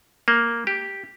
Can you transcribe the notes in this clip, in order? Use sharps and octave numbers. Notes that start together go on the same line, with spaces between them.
A#3
G4